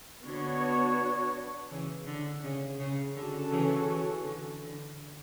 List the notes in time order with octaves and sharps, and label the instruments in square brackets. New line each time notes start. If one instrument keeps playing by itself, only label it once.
[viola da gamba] D3 [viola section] B3 D4 F#4 C#5
[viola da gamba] C#3 E3
D3
C#3
C#3
[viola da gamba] D3 [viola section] C#4 F#4 A4
[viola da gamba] C#3 E3
C#3 E3
D3
D3